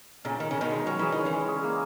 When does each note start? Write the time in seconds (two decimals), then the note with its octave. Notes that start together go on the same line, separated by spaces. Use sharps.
0.25 A#2 C#3 A#4
0.40 D#3 A#4
0.51 C#3
0.56 A#4
0.61 B2 D#3
0.72 G#3
0.86 F#3 C#4
0.99 E3 G#4
1.12 D#3
1.18 C#4
1.25 C#3 E3
1.33 G#3
1.48 G#4
1.64 A#3